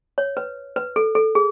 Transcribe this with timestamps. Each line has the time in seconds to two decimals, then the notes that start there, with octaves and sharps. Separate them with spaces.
0.18 C#5
0.37 B4
0.76 B4
0.96 A4
1.15 A4
1.35 G#4